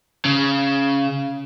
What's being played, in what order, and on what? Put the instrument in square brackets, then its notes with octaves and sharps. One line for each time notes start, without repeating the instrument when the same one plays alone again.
[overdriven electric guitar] C#3